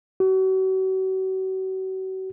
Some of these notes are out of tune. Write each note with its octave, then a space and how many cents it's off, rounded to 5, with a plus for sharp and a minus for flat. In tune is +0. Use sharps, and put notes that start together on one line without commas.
F#4 +40